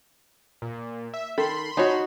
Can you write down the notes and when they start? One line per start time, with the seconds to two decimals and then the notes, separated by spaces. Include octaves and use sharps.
0.62 A#2
1.14 E5
1.38 D#3 A4 B5 C6
1.77 D#4 F#4 C#5 G#5 A5